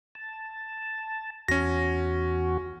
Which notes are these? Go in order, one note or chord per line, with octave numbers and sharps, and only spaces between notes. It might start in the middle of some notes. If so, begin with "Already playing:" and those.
A5
E2 C#4 F#4 A#6